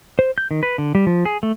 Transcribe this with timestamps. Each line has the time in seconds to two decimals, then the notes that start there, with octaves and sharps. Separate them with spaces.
0.19 C5
0.38 G6
0.51 D#3
0.63 B4
0.78 D3
0.95 G3
1.07 F3
1.25 G#4
1.43 A3